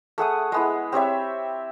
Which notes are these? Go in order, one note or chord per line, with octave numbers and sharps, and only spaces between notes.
A3 G#4 F#5 D#6
G#3 B3 E4
C4 G4 C#5 E5